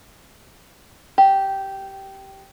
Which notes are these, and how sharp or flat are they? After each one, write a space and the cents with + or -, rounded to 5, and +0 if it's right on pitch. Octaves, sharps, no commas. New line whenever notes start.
G4 -10